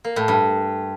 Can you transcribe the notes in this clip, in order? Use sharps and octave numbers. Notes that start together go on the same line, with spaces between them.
A#3
A2
G2